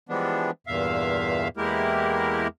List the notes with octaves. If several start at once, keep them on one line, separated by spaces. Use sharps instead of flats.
E3 F3 G3 G#3 B3 D4
E2 G2 A#2 E5 F5
E2 G#3 A#3 E4 G4 A#4